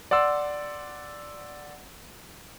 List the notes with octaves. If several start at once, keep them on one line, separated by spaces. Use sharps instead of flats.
D5 F#5 C6 E6